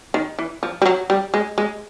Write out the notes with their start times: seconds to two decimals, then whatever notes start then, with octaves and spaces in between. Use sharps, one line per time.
0.14 D#3
0.39 E3
0.63 F3
0.82 G3
0.86 F#3
1.10 G3
1.34 G#3
1.58 G#3